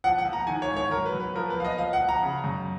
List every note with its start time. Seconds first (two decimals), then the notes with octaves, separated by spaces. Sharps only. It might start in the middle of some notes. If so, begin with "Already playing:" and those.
0.04 F3 F#5
0.18 F#5
0.25 F3
0.33 A#5
0.47 D#3 G#5
0.62 C#5
0.70 G#2
0.77 C#5
0.91 F#3 A#4
1.06 B4
1.13 F#3
1.20 B4
1.35 F3 A#4
1.50 B4
1.58 F3 F5
1.65 D#5
1.78 F3 F5
1.93 F#5
2.01 F3
2.09 A#5
2.23 C#3
2.44 F#2